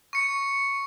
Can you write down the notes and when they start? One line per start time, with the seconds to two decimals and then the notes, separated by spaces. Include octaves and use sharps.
0.13 C#6 C#7